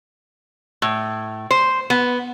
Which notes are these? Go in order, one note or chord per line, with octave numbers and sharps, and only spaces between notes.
A2
C5
B3